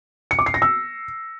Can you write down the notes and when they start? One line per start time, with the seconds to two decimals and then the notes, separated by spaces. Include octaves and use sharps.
0.31 C#7
0.39 D6
0.46 C7
0.54 A#6
0.62 E6